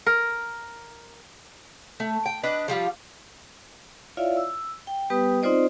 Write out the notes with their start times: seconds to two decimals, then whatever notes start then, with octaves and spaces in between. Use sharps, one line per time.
0.06 A#4
2.00 A3
2.26 G5
2.43 D4 B4 D#5
2.68 F3 G3 F4
4.17 E4 F4 C#5 D5 E5 F5
4.37 E6
4.87 G5
5.10 G3 B3 G4 B4 G5 D#6
5.42 C4 D#4 F4 C5 D5 D#5